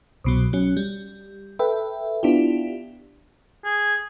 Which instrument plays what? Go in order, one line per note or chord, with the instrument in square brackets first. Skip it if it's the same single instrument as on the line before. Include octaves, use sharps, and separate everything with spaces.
[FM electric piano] C2 B2 F#3
F#3 C#4
G3
A4 B4 E5 G5
B3 D4 E4 F4 G4
[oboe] G#4